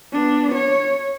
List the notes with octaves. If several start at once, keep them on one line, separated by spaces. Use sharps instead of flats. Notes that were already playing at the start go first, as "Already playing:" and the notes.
B3 D4
C#5